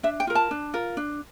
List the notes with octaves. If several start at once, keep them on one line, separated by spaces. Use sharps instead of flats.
D4 E5
G5
F4 A#4
A5
D4
F4 A#4
D4